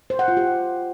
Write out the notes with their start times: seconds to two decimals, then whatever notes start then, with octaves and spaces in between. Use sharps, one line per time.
0.10 C5
0.19 F#5
0.28 F4
0.37 G4